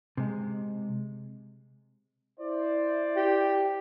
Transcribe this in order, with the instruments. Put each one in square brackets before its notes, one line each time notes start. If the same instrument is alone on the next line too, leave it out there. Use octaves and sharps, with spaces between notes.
[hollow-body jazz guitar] C3 G#3
[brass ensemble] E4 C5 D5
[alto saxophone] G4